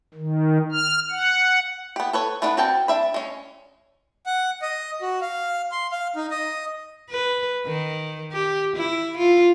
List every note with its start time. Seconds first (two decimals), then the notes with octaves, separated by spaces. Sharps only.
0.14 D#3
0.72 F6
1.11 F#5
1.96 B3 G4
2.13 A4 B4 C#5
2.42 A3 B3 D4 E4 B4
2.57 C4 F#4 A#4 G5 A5
2.88 D4 E5 B5
3.14 G#3 C#4
4.26 F#5
4.62 D#5
5.02 F#4
5.22 F5
5.72 C6
5.92 F5
6.16 D#4
6.31 D#5
7.10 B4
7.66 D#3
8.32 G4
8.76 E4
9.17 F4